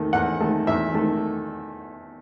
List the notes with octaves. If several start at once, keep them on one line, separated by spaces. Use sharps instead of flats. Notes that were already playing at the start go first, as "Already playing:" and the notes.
Already playing: E2 D#3 A3
E2 F#5
D#3 A3
E2 E5
D#3 A3